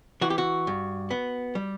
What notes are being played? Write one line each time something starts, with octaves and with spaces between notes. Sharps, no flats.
E3 F#4
G4
F#4
G2
B3
G3